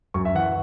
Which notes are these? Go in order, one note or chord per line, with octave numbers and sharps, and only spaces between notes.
F#2 C#6
E5
E3 F#5